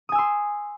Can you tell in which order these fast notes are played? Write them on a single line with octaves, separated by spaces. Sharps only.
D#6 G#5 E6 C6